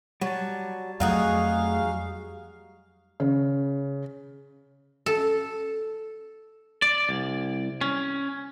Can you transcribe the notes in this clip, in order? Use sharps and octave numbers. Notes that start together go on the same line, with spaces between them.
F#3 G3 A5
F2 F#3 A3 D#4 F#4 G#4 F5
C#3
A4
D5
C2
C#4